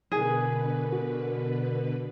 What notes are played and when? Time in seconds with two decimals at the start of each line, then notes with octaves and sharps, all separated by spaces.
0.12 B2 D3 G#4 A#4 B4
0.92 F#4